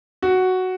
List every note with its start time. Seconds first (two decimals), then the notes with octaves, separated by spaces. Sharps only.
0.23 F#4